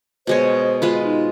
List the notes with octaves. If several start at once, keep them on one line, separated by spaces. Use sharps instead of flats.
B2 G#3 C5 C#5
G#3 F4 B4
D#4